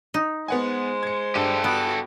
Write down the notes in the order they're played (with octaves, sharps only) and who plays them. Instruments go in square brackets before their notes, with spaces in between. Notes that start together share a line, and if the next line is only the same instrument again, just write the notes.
[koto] D#4
[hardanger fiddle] G#3 C5 [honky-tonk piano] B3 F#5 G#5
[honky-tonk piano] G#6 C#7
[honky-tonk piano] G2 D4 D#7 [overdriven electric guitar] G4 A4
[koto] B3 [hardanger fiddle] F#4 D6